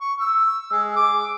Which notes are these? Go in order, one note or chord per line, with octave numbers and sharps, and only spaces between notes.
C#6
E6
G#3
D6